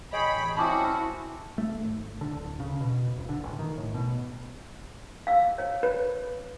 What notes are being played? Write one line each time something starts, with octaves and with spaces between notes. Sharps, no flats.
A1 G#4 C#5 D#5 G5 B5
C4 C#4 E4 F#4 A5 D6 D#6
A3
G#1
D3
D1
C#3
B2
D#1
D3
A1
D#3
A2
B2
F5 E6
C#5
B4 C#5